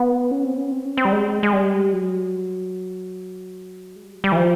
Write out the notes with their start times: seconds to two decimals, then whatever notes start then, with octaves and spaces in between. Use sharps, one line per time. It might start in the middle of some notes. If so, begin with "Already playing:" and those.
Already playing: B3
0.31 C#4
0.45 C4
0.57 C#4
0.72 C4
0.85 C#4
0.97 C4
1.05 G3
1.12 G#3
1.43 G#3
1.53 G3
1.93 F#3
3.96 G#3
4.05 G3
4.15 F#3
4.24 G3
4.32 E3
4.36 F3